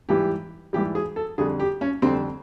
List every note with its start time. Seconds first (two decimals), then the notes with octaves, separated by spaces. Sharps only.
0.09 G#2 E3 G3 G4
0.73 G#2 E3 G3 G4
0.95 G#4
1.16 A4
1.38 F2 D3 G3 G#4
1.60 G4
1.81 C#4
2.02 F2 D3 G3 C4